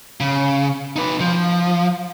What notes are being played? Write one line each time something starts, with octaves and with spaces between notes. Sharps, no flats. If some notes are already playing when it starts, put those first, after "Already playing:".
C#3
D#4 B4
F3